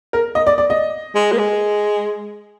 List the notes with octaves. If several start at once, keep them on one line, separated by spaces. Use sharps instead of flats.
A#4
D#5
D5
D5
D#5
G#3
A#3
G#3